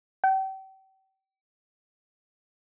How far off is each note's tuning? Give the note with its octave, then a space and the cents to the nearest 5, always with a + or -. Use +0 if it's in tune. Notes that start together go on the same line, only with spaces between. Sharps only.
G5 -35